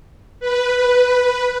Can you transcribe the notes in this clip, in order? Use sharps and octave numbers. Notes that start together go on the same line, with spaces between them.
B4